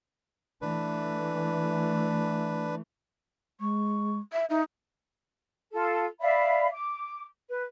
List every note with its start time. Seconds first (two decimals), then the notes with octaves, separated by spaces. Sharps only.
0.61 E3 A3 D4 B4
3.60 G#3 C#6
4.33 E5
4.50 D#4 E5
5.72 F4 A4
6.20 D5 E5 F5 B5
6.71 D6
7.48 B4